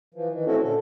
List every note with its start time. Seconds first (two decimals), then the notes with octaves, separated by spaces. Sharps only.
0.14 E3 F3
0.31 D#3 E3
0.46 A3 C4 C#4 E4 F#4 A4
0.62 A#2 D3 A4